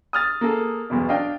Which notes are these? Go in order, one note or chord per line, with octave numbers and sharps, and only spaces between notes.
D#6 F6 A6
A#3 G#4 A4
B1 E2 B2
D4 D#5 F5 G5